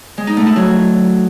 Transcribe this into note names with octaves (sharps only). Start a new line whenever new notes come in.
G#3
D#4
A3
E4
F#3